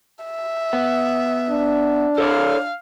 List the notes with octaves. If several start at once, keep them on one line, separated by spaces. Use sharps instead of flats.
E5
B3
D4
A4 C#5 D5 F5